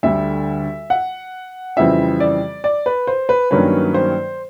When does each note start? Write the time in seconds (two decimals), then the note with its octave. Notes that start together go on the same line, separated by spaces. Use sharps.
0.03 D2 D3 G3 E5
0.90 F#5
1.77 F2 C#3 E3 G3 C4 E5
2.20 D5
2.64 D5
2.86 B4
3.07 C5
3.29 B4
3.51 G2 D#3 F#3 A#3 C#4 B4
3.94 C5